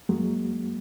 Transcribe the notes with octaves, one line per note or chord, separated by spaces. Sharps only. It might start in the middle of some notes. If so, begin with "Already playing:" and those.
F#2 F#3 G#3 A#3